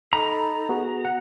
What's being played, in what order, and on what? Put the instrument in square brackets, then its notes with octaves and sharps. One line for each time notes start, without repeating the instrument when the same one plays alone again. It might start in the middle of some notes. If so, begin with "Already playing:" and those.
[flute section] D#4 A4 D#5 [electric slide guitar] A#5 [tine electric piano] B5
[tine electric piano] B3 F#4 G#4
F#5